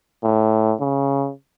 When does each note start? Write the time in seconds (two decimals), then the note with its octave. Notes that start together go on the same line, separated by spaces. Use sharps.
0.23 A2
0.80 C#3